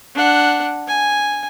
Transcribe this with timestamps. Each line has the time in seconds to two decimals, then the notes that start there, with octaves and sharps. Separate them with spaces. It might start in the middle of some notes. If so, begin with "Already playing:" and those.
0.15 D4 F#5
0.88 G#5